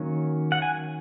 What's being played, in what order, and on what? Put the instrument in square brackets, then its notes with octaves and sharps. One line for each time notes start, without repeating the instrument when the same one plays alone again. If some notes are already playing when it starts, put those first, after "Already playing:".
Already playing: [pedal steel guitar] D#3 F#3 A#3 C#4
F#5
G#5